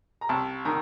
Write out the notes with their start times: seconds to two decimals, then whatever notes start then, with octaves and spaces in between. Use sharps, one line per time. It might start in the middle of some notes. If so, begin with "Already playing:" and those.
0.21 A#5
0.29 C2 A5
0.65 D#3 A#5